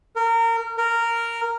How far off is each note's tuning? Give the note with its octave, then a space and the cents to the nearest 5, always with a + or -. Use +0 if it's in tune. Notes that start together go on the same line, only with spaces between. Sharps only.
A#4 -25
A#4 -10